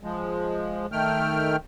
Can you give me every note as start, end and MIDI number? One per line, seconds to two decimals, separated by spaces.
0.04 0.86 53
0.04 0.86 56
0.92 1.56 51
0.92 1.56 57
0.92 1.56 79
0.92 1.56 89